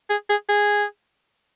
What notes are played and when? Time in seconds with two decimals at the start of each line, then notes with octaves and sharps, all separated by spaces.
0.10 G#4
0.30 G#4
0.49 G#4